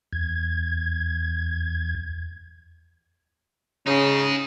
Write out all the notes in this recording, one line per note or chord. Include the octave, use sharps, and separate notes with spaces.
E2 G#6
C#3 C#4 D#4 G#4